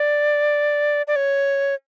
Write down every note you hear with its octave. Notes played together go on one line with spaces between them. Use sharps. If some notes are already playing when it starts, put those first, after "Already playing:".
Already playing: D5
D5
C#5